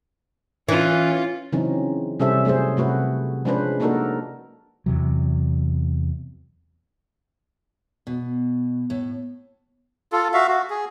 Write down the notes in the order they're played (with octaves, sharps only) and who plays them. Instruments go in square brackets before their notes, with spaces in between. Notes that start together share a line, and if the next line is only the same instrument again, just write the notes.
[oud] E3 [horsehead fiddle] C#4 F4
[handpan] C#3 E3 F#3 C4 C#4 D#4
C3 G3 C#4 A4 C5 E5
F#3 A3 C#4 G#4 C5
C3 A3 F#4 B4
F3 G#3 C#4 D4 B4 C5
A#3 D4 D#4 F#4 A4 A#4
[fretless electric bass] E2 C3 F#3
[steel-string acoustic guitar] B2
A2
[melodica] F4 A4
F#4 E5 F5
F#4
G#4